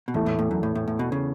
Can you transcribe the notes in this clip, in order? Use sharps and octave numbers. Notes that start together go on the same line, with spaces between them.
B2
E2 A2 E3 A3
A2
A2
F#2
A2
A2
A2
B2
C#3